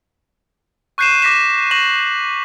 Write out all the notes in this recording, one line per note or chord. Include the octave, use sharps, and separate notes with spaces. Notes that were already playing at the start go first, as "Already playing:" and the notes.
C#6 F#6 G6 C7 D#7 E7
D6 A#6 B6 E7
C#6 A#6 E7 F#7